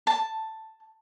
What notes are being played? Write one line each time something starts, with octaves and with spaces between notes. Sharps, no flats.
A5